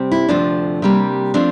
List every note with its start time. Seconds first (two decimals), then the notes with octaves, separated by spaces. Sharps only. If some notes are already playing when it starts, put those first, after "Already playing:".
Already playing: C3 G3 C4
0.11 E4
0.29 D2 C3 F3 A3 C4 D4
0.82 C3 G3 A#3
1.34 F3 A3 C4 D4